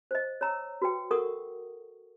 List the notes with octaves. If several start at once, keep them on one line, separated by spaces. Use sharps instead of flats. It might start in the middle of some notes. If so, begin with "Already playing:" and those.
C5 D#5
C#5 A#5 E6
F#4 B4 G5
A4 A#4 F#5 C#6 D#6